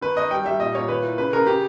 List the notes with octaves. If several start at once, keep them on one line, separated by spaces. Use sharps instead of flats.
D#3 B4
D#3 D#5
G3 G5
G3 E5
A#2 D#5
A#2 C#5
D#3 B4
E4
C#3 B4
C#3 A#4
C#3 G4